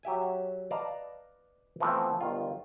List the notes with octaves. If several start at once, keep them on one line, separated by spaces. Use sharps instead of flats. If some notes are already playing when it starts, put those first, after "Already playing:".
F#3 G4 E5 G#5
B4 D5 D#5 F5 A5 A#5
E3 F3 A3 B3 C4
G1 D#3 F4